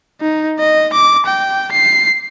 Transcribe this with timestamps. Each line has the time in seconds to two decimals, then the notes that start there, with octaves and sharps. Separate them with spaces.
0.21 D#4
0.59 D#5
0.93 D6
1.26 G5
1.72 C7